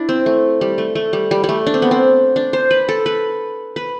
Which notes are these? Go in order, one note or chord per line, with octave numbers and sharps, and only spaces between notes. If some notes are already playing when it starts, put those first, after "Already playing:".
Already playing: D4 E4
C4
A3
G3
A3
A3
G3
G3
G3
A3
D4
C4
B3
C4
D4
C5
B4
A4
B4
B4